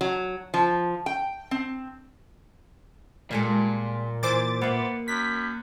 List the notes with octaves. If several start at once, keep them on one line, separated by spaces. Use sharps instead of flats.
F#3
F3
G5
C4
A#2 G3 G#3 A4
E3 C5 D6 A6
A#3 B3 E5
F#2 B6